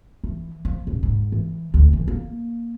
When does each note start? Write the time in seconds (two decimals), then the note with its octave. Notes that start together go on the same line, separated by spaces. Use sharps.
0.24 E3
0.65 F3
0.87 D#1
1.03 G#2
1.32 E3
1.74 D2
1.93 E3
2.08 A#3